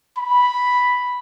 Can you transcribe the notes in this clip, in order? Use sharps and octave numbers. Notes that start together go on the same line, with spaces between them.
B5